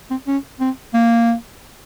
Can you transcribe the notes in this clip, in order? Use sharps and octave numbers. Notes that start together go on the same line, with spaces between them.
C4
C#4
C4
A#3